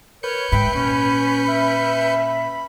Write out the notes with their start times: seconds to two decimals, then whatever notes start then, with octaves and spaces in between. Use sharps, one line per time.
0.23 A#4 B4 C#5 G6 C#7
0.52 G#2 E5 G5 B5
0.74 A#2 C#4
1.48 C#4 E5